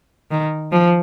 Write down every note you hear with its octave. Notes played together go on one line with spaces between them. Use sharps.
D#3
F3